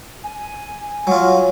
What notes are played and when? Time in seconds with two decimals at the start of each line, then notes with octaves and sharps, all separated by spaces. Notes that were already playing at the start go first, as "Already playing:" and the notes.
0.24 G#5
1.07 F#3 F4